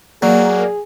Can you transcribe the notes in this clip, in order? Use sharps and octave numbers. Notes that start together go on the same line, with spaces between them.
F#3 A#3 G#4 D5